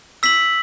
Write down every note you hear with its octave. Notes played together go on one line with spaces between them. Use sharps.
E6 B6 F#7